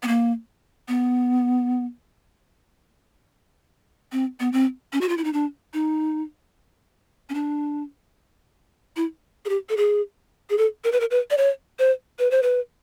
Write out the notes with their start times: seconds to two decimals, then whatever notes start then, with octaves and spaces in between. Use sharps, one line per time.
0.03 B3
0.08 A#3
0.88 B3
4.12 C4
4.40 B3
4.52 C4
4.93 C#4
5.01 F#4
5.09 F4
5.18 E4
5.24 D#4
5.33 D4
5.74 D#4
7.29 C#4
7.34 D4
8.96 E4
9.45 G#4
9.49 G4
9.69 A4
9.77 G#4
10.50 G#4
10.58 A4
10.84 A#4
10.92 B4
11.00 A#4
11.11 B4
11.30 D5
11.38 C#5
11.79 C5
12.19 B4
12.31 C5
12.43 B4